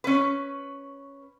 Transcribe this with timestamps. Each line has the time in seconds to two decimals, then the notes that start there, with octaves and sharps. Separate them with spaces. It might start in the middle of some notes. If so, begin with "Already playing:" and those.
0.04 C#4 B4